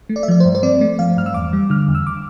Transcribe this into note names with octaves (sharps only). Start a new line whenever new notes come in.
A3
D5
E5
F3 D5
G2 C5
C5
C4 D5
A3
F3 F5
G2 F6
E6
E2 D6
G3
D3 F6
E2
E6
D6